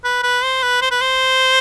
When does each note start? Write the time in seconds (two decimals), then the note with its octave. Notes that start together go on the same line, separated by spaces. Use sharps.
0.04 B4
0.23 B4
0.43 C5
0.62 B4
0.81 C5
0.91 B4
1.01 C5